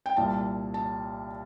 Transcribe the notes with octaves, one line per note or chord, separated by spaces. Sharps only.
G5
C2 A#2 A5
A5